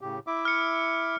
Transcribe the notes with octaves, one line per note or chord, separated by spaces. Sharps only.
A2 C#3 G4
E4 E5 D6
F6 C#7